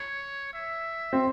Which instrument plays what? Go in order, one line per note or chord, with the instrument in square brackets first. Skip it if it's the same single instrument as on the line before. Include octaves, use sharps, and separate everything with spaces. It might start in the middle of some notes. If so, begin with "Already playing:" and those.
Already playing: [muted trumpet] C#5
E5
[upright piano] C4